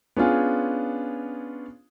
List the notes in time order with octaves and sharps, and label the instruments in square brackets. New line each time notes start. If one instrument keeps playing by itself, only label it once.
[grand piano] B3 C#4 D4 F4 G#4